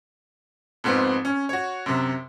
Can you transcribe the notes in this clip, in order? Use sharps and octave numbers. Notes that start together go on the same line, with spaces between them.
F2 G#2 B3 C4
C#4
F#4 C#5
F#2 C3